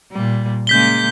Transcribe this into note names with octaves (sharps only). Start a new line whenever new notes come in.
A#2 G3
C#3 G#3 A#3 G6 B6 G7